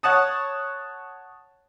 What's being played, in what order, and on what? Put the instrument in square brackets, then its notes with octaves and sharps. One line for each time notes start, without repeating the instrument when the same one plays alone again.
[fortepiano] C#5 F#5 A5 D#6